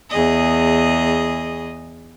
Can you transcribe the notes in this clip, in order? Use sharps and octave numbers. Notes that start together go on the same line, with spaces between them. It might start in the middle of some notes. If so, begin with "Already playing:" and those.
E2 G#4 D#5